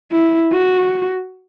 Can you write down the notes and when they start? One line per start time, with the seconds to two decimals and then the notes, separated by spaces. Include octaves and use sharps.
0.12 E4
0.52 F#4